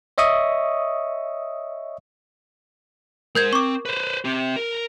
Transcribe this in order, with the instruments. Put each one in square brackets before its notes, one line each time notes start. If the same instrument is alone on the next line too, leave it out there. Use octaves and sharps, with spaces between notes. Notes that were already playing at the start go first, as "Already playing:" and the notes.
[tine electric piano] C#5 D#5 E5 C#6 D#6
[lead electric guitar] G#3 C5 [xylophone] A#4 G6 G#6
[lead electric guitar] C4 [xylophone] C#6 D6
[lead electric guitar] B4 C5
C4 G4
A#4